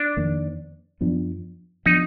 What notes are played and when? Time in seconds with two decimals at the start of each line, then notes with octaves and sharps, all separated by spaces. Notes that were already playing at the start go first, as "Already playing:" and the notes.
Already playing: D4
0.17 F2 D#3 A#3
1.01 F#2 F3 B3 D4
1.86 F3 B3 D4 D#4